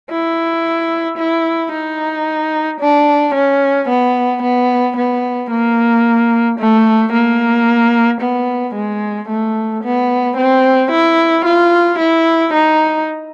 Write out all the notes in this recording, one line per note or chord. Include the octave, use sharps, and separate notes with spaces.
E4
E4
D#4
D4
C#4
B3
B3
B3
A#3
A3
A#3
B3
G#3
A3
B3
C4
E4
F4
E4
D#4